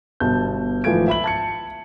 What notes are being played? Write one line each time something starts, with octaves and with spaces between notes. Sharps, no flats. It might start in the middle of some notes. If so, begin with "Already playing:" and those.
G1 B2 A5 G6
G#1 E3 F3 A3 G#6 D7
E5 B5 F#7
A5 G#6 C#7